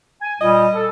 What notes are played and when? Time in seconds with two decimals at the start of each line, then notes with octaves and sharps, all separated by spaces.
0.22 G#5
0.41 A#2 G3 D#5
0.74 A4